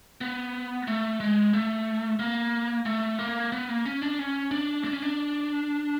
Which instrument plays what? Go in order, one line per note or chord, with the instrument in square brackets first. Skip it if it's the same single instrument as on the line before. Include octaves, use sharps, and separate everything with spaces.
[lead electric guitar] B3
A3
G#3
A3
A#3
A3
A#3
B3
A#3
C#4
D4
C#4
D4
D4
C#4
D4